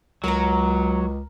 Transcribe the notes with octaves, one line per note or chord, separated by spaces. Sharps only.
C#2 F#3 A#4 A#5